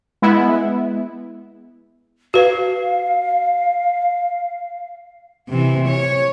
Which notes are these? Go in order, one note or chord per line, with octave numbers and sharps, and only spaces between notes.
G#3 B3 E4
F#4 B4 F5
C3 E3
C#5